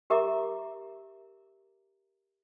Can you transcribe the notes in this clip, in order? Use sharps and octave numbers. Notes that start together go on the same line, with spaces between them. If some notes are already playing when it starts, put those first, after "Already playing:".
G4 A#4 E5 A#5 D6